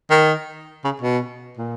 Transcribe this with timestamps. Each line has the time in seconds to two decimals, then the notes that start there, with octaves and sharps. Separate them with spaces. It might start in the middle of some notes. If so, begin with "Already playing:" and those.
0.10 D#3
0.84 C#3
1.02 B2
1.57 A#2